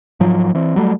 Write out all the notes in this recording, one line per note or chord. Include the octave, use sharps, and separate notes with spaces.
G#2 F3 F#3
E3 C4
F#3 G3 A3